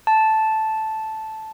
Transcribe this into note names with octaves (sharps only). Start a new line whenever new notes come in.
A5